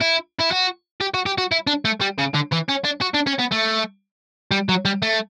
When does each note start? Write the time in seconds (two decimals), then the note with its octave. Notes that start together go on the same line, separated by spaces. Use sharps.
0.01 E4
0.39 E4
0.51 F#4
1.01 G4
1.14 F#4
1.26 G4
1.38 F#4
1.52 E4
1.67 D4
1.85 A3
2.01 G3
2.18 C#3
2.34 D3
2.52 E3
2.69 C#4
2.84 D4
3.01 F#4
3.14 D4
3.27 C#4
3.39 B3
3.52 A3
4.51 G3
4.69 F#3
4.85 G3
5.02 A3